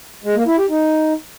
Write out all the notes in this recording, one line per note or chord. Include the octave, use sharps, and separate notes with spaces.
G#3
A#3
E4
G4
D#4